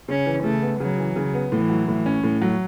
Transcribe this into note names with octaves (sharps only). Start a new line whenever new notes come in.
C#3 C#4
E3
C#3 A3
B3
C#3 F#3
E3
C#3
B3
A2 E3
F#3
A2
C#4
A2
F#3